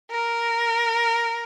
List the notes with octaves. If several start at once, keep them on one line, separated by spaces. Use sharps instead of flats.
A#4